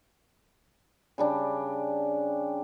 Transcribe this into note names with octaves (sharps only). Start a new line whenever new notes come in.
C#3 G3 D4